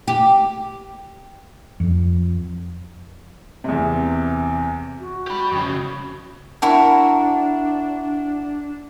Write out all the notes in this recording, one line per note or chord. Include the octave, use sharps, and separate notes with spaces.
G4
F2
E2 C3
F#4
G4 B5
F2 C#3
D4 E4 F#4 A#4 A5